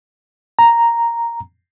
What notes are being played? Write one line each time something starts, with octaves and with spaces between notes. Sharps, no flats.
A#5